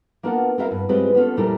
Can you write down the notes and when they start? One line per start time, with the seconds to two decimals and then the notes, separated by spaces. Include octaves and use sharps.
0.23 A#3 B3 D4 F4 A#4 F#5
0.58 C4 E4 F#4 A#4 E5 F5
0.71 G2
0.89 G3 G#3 C4 F4 G4 B4
1.14 B3 C#4 F4 A4
1.37 F2 A#2 G3 E4 A4 A#4